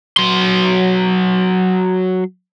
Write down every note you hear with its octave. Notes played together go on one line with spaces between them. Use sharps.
F#3 C6